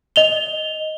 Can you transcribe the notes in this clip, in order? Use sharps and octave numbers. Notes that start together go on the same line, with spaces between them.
D#5 F7 G7